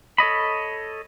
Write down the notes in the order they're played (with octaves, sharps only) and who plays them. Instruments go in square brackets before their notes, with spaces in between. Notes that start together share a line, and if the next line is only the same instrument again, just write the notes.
[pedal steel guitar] A4 C#5 D#5 B5